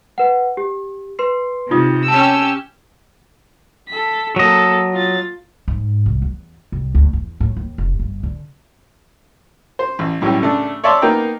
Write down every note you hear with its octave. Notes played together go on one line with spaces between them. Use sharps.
B4 F#5
G4
B4 C6 C7
C3 D#4 F4 D#6
C#4 G4 A5 E6
A4 B6
F#3 A#3 A4 D#5
F4 A6
G#2
C2
E2
C2
D2
E2
A2
D#2
F1
G1
D3
C5
A1
B1 A2 G3 C#4 G4
C#3 A3 D4
C#5 D5 E5 A5 C6 D6
A#3 B3 D#4 G5 A#5